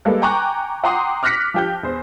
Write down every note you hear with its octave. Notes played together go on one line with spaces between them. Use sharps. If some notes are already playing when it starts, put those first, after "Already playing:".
G3 G#3 A#3 A4 B4
G5 G#5 A#5 C#6 D6 F#6
F#5 G5 A#5 C6 D6 D#6
D6 F6 F#6 A#6 B6 C#7
F3 G4 G6
E2 C5